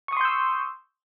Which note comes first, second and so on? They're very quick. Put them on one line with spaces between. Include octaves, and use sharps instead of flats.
C#6 D#6 C6 G6 E6